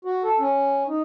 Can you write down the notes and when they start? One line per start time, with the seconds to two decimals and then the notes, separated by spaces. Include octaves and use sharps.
0.05 F#4
0.24 A4
0.39 C#4
0.87 D#4